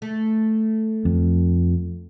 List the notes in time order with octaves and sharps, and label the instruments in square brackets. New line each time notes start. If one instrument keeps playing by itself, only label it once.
[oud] A3
[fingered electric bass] F2